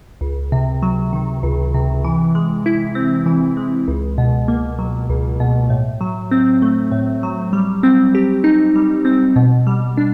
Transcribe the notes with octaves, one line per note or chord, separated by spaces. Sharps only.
C#2
C3
F#3
D#3
C#2
C3
E3
G#3
E4
C4
E3
G#3
C#2
B2
A#3
F#3
C#2
B2
A2
F#3
C4
A3
A2
F#3
G3
C4
G4
D#4
G3
C4
B2
G3
D4